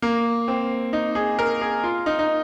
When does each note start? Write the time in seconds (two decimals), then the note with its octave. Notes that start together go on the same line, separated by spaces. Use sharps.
0.02 A#3
0.48 C4
0.93 D#4
1.15 G#4
1.39 A#4
1.61 G#4
1.83 F4
2.06 D#4
2.19 D#4